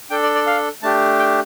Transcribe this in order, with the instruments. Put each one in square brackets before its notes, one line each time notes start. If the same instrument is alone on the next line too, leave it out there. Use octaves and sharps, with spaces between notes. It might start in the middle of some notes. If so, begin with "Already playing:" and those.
[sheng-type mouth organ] D4 A4 G5
D5
D5
F5
A3 D4 G4 A5
G5